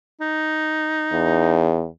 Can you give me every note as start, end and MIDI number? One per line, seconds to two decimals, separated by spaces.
0.21 1.84 63
1.12 1.88 40